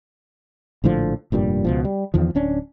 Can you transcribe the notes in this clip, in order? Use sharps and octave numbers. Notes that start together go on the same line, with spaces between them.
A#1 A2 D3 F3
F1 G2 A#2 G3
C#2 B2 F3
G3
E2 D#3 F3
D1 C#4 D4